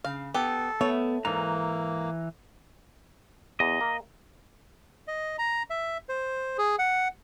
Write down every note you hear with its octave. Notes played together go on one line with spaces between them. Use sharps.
C#3 F5
B3 G4 A4
A3 B3 C#5
G#2 E3 A#3 A#5
E2 D#5
A#3
D#5
A#5
E5
C5
G#4
F#5